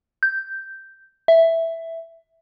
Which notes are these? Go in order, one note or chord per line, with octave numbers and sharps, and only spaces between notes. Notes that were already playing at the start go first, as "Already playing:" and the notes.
G6
E5